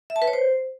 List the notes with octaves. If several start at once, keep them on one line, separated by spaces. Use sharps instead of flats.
E5
A5
B4
C#5
C5